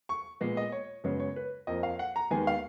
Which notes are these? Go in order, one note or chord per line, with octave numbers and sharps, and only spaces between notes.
C#6
A#2 G#3 B3
D#5
C#5
F#2 C#3 G#3 B3 C#5
C#5
B4
F2 F3 A#3 D#5
F5
F#5
A#5
D#2 D#3 G#3 B3 G#5
F5